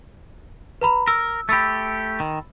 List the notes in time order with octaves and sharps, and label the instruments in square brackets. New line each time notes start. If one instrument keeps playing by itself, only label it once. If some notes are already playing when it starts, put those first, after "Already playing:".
[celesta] B4 A#5 B5
[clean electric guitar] A#4 [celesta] E6
[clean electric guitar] A3 G4 [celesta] B5 E6 A6
[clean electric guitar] D#3